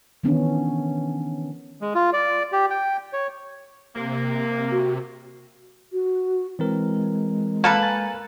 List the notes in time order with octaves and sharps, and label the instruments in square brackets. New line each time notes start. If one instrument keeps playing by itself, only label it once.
[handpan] D#3 E3 B3 C#4 D4
[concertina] G#3
F4
D5
G4
G5
C#5
[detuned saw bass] C3 [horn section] A#3
[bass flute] F#4
[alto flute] F#4
[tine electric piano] E3 C4 A#4 [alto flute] G#3
[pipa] A#3 A4 B4
[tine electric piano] G#5 A#5 A6